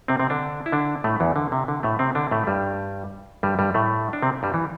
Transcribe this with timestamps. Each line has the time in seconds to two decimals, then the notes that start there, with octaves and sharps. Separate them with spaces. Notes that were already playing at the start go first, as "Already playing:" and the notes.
0.08 C3 C4
0.20 C3 C4
0.30 D3 D4
0.66 E4
0.72 D3 D4
1.04 A2 A3
1.20 E2 E3
1.36 D3
1.52 C3
1.68 D3
1.83 A2 A3
1.99 C3 C4
2.15 D3 D4
2.31 A2 A3
2.47 G2 G3
3.43 G2 G3
3.59 G2 G3
3.74 A2 A3
4.13 D4
4.22 C3 C4
4.43 G2 G3
4.54 E3